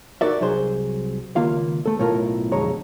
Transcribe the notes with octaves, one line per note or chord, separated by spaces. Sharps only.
D#4 F#4 A#4 D5 E5
C2 F#3 G#4 C5
C#2 D#3 A#3 F4 F5
A3 A4
B1 A2 A3 F4 A#4 A#5
B1 F2 D3 G#3 C#5 A#5